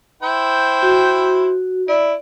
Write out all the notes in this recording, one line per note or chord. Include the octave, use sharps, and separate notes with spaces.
E4 C5 G5
F#4
E4 D5